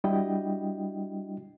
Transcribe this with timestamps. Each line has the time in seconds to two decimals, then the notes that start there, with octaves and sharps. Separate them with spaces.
0.04 G3 D4 E4 F#4 D#5 G5